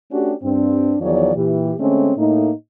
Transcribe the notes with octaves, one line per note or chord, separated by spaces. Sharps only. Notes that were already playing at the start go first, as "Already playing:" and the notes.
A3 C#4 D4 F#4 G4
G2 C4 D4
E2 D#3 F3 F#3 C#5 D5
A#2 E3 G4
D3 G#3 A3 C4 C#4
A2 A3 A#3 D#4